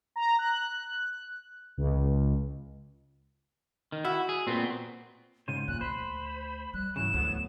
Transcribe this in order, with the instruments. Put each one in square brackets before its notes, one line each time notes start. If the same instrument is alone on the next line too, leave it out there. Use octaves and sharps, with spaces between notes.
[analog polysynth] A#5
F#6
C#2
[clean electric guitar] D#3
[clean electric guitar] E4 [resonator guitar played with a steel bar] F#4
[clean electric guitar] G#4
A#2 B3 C4
[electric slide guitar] G#2 C#3 C5 [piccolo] D#7
[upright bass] F2 [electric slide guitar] A#2 [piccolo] F#6
[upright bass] D2 [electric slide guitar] C5 [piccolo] B5
[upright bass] G3 [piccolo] F#6
[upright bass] G#2 [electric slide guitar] C#3 E3 F#3 [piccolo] E7
[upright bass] D2 [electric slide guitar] A2 F#3 B3